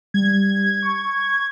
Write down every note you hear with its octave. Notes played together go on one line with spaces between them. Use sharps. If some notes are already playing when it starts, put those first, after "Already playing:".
G3 G#6
C#6